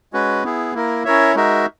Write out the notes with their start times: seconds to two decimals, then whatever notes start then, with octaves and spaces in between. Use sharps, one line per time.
0.13 G#3 C#4 F#4 B4
0.44 B3 E4 G#4
0.74 A#3 E4 A#4
1.04 C#4 E4 A#4 C#5 E5
1.35 G#3 D#4 F#4 A#4 E5